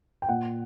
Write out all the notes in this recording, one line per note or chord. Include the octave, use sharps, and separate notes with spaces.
G5
A#2 F#5